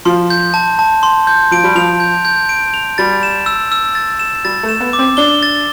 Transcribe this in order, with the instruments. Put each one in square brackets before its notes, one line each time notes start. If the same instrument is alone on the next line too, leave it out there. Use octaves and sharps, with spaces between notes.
[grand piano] F3 [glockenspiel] C6
[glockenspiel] G6
A5
A5
C6
G6
[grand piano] F3 [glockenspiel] D7
[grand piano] G3
[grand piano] F3 [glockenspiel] F7
[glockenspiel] G6
G6
D7
F7
[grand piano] G3 [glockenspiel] A6
[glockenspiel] E7
E6
E6
A6
E7
[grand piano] G3 [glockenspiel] A6
[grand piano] A3
[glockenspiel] E7
[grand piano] B3
[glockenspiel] D6
[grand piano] C4
[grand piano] D4 [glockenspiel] G7
[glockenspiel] A6